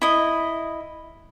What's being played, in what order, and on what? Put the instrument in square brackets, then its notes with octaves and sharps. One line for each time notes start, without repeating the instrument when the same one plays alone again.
[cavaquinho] E4 D#5